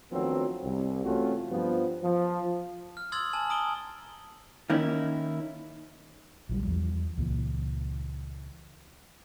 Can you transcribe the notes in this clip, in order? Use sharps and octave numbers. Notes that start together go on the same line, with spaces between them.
D2 D#3 F3 F#3 B3 C4
C2
E3 A3 C4 C#4 F4 F#4
G2 F3 B3
F3
F6
C6 D#6 E6 G#6 A6 F#7
G#5 A5 F#7
A#5 D#6 D7 G7
D#3 A#3 C#4 D#4 E4
A#1 E3 G3
E2 F3 G3
C#2 A#2 E3